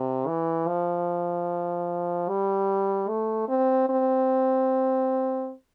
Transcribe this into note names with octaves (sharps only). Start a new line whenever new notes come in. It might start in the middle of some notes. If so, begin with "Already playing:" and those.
Already playing: C3
E3
F3
G3
A3
C4
C4